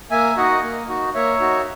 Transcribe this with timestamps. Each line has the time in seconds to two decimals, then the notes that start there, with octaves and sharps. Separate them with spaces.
0.11 A#3 E5 G#5
0.37 D#4 F#4 D#5 F#5
0.63 A#3
0.89 D#4 F#4
1.14 A#3 C#5 E5
1.40 D#4 F#4